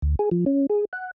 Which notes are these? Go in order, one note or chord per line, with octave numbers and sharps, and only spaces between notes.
D2
G#4
F3
C#4
G#4
F#5